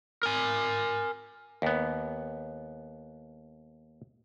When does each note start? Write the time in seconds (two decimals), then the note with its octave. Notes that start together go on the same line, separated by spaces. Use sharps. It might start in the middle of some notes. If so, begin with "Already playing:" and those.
0.23 A#4 G#5
1.62 D#2 B3